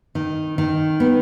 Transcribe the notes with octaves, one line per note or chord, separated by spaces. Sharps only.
D#3
D#3
B3